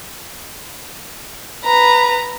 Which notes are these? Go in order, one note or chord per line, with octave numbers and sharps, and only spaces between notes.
B4 A#5